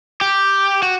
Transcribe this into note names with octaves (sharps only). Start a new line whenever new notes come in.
G4
F#4